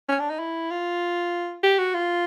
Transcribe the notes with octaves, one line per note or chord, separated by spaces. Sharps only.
C#4
D4
D#4
E4
F4
G4
F#4
F4